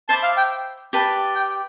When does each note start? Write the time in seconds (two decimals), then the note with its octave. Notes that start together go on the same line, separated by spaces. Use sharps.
0.09 C5 E5 A5 B5 D6
0.23 F5
0.37 G5
0.93 G4 B4 D5 A5
1.35 G5